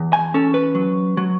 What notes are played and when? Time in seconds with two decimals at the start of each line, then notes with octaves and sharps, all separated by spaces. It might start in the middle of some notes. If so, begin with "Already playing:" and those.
Already playing: E2
0.13 G#5
0.34 C#4 A4
0.54 B4
0.75 F#3
1.17 F#3